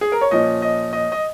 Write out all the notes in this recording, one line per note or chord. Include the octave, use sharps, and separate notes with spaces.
G#4
A#4
C#5
A#2 F3 C#4 D#5
D#5
D#5
D#5